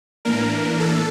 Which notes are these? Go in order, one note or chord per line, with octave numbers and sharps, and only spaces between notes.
A2 E3 A#3 D4 A#4
A4